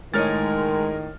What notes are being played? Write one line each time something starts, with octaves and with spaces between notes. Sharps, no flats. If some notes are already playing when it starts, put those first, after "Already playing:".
A2 D#3 G#3 A#4 C#5 D#5 F6 A6